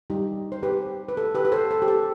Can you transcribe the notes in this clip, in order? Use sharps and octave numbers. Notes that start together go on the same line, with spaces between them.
G3 D#4 G4
C5
G4 B4
B4
A4
G4 B4
B4
A4 C5
A4
G4
A4